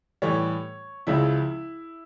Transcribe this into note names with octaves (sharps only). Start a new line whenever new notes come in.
A2 E3 G3 C#5
C#2 C#3 F3 E4